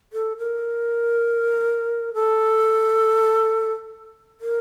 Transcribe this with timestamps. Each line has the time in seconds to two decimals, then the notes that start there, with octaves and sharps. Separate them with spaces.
0.13 A4
0.38 A#4
2.14 A4
4.41 A#4